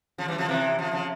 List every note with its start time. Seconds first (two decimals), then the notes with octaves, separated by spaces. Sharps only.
0.18 C#3 F3
0.28 E3 G3
0.38 C#3 F3
0.48 C3 E3
0.79 C#3 F3
0.93 C#3 F3